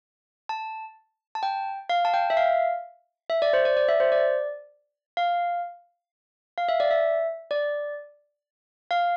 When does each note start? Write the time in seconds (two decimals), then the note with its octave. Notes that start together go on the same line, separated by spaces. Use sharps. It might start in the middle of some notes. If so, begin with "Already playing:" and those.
0.49 A5
1.35 A5
1.43 G5
1.89 F5
2.05 A5
2.14 G5
2.30 E5
2.37 F5
3.30 E5
3.42 D5
3.53 C5
3.65 D5
3.77 D5
3.89 E5
4.00 C5
4.12 D5
5.17 F5
6.58 F5
6.69 E5
6.80 D5
6.91 E5
7.51 D5
8.91 F5